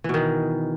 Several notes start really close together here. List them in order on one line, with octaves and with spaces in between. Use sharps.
E3 B2 D#3